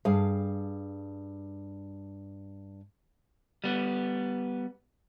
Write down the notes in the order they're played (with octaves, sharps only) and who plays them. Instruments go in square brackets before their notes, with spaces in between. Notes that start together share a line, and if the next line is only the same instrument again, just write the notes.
[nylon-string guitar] G2 G#4 F5
[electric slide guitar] G3 B3